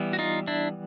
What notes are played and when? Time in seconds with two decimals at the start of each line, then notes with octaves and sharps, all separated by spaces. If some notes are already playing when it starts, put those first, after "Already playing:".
Already playing: E3 G3 B3
0.13 F#4
0.19 D#4 F4
0.47 D4 E4